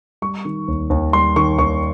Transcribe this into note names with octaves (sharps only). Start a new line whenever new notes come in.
G3 C#6
D#3
D#2
D#2
G3 C6
D#3 C#6
D#2 C#6